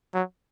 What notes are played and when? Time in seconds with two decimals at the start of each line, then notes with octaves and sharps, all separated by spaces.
0.14 F#3